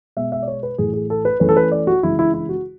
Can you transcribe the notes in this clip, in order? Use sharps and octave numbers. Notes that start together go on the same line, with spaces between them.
B2 G#3 B3 E5
E5
D5
C#5
B4
A2 E3 A3 G#4
G#4
A4
B4
E3 A3 C#4 B4
A4
B4
D5
F#4
C#3 E3 G#3 E4
E4
E4
F#4